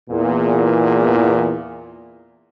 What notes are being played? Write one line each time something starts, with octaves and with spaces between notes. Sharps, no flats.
E2 A#2